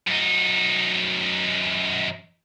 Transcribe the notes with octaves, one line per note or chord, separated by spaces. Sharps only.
F#2 D#4